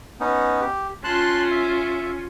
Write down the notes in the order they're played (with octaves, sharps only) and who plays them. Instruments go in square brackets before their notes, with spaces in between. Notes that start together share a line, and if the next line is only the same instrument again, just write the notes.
[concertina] B3 C#4 D#4
G4
[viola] C#4 F4 [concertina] A5 C6 F#6
[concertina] E5